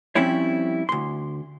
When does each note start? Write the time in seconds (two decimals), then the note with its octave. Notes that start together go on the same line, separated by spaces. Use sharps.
0.15 F3 G3 C4 C#4 E4 C#5
0.89 D2 C6